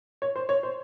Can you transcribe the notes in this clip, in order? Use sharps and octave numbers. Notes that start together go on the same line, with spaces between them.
C#5
C5
C#5
C5